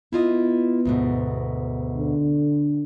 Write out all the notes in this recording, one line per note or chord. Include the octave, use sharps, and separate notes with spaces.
B3 E4 F4 D#5
D2 G#2 B2
D3